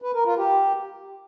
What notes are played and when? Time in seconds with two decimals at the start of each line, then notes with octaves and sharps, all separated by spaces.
0.02 B4
0.14 A#4
0.25 F4
0.37 G4